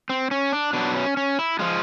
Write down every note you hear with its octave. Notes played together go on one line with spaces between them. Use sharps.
C4
C#4
D4
B2 F#3 D4
C#4
C#4
E4
F3 G#3 F4